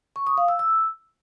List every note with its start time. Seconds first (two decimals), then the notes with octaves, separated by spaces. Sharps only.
0.16 C#6
0.27 D#6
0.38 F5
0.48 E6
0.59 E6